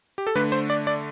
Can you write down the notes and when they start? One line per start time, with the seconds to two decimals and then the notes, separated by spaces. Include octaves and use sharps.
0.18 G4
0.27 A4
0.35 D3 A3 D4 B4
0.52 C5
0.70 D5
0.87 D5